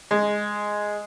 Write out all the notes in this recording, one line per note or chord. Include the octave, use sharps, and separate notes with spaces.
G#3